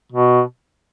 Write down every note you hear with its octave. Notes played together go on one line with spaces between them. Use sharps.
B2